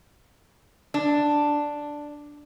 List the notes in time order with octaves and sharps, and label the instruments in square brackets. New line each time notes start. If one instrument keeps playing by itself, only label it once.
[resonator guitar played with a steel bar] D4